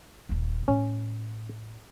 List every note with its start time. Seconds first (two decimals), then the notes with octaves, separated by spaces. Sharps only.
0.29 D#1 E4
0.68 A2 C#4